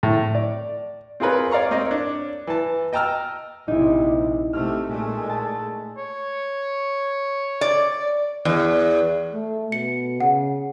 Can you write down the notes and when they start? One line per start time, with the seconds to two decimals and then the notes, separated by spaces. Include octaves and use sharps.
0.03 A2
0.35 D5
1.20 C4 F4 G#4 A#4 B4 C#5
1.51 C#5 D5 F5 A#5 C#6
1.71 A#3 C4 A#4 D#5
1.86 D4 C#5
2.47 E3 A5
2.93 D#5 G5 A5 A#5 E6 F6
3.68 A#1 C3 D#4 E4
4.53 C3 A3 F6
4.88 A#2 G#3 A3
5.29 A5
5.98 C#5
7.61 D5
8.45 E2
9.33 A3
9.72 B2 C#7
10.20 C#3 F#5